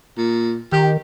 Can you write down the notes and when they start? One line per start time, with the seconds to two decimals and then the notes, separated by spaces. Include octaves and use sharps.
0.18 A#2
0.72 D#3 G4